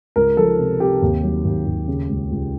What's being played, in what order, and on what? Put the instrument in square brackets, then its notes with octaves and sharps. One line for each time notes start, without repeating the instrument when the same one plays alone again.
[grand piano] C#2 A#4
F3 A4
C3
C3 G4
D#2
F#3
D#2
D#2
C#3
C#2
C#2